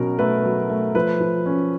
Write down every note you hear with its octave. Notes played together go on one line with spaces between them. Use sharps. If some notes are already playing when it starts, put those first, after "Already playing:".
Already playing: B2 F#3 C#4 A#4
A3 B4
F#3
A3
F3 B4
F3
C#4